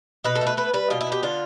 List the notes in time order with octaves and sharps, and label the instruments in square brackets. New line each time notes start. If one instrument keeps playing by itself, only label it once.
[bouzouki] B2 B4
A4
A3
B4
B3 B4
G3 B4
B2 F4
E4
B3
G4
D3 F4